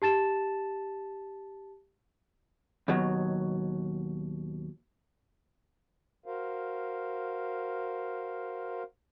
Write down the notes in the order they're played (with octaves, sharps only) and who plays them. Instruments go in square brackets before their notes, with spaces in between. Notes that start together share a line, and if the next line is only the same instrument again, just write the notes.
[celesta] G4 A5 A6 E7
[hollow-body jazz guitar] D#2 B2 F#3
[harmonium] F#4 A#4 C5 F5